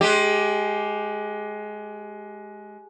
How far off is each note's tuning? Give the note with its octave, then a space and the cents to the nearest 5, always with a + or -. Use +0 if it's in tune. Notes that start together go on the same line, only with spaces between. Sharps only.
G#3 +20 G4 +0